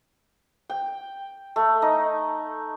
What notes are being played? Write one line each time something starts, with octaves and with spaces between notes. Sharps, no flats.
G5
A3
D#4